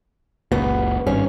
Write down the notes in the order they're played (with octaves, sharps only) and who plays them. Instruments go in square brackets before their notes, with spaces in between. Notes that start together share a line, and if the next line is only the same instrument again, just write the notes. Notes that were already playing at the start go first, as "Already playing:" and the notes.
[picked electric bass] F#1 C#2 A#2 [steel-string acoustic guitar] B3
[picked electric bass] G#1 G2 [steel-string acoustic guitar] C#4